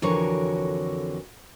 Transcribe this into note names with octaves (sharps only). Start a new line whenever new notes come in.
F2 D3 E3 F#4 A#4 C#5